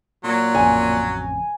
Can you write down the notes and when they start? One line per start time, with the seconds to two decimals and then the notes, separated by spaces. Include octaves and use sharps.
0.24 A#2 F#3
0.54 A1 F2 C#3 G#5